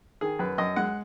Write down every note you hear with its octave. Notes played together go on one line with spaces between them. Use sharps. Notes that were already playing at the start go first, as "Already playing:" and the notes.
D#3 G#4
F#2 B4
F#2 D#5
G#3 F#5